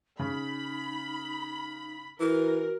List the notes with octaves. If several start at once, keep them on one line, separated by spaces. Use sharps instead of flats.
C#3 D#4 B5
E3 F#4 A#4